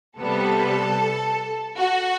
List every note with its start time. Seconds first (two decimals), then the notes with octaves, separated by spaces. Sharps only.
0.19 C3 G3 B3 A4
1.78 F#4